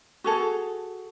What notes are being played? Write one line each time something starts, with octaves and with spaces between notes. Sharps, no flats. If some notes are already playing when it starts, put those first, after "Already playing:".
F#4 G#4 A4